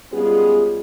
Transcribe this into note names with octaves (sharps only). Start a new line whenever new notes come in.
G3 G#3 B3 C#4 F4 G#4